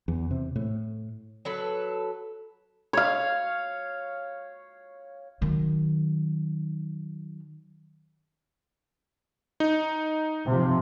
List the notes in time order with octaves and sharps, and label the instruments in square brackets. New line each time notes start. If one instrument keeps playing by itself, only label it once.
[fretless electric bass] E2
C3
A2
[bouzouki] F#3 A4 B4
[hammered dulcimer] C#5 F5
[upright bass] D#3 F#3
[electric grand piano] D#4
[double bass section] C3 F3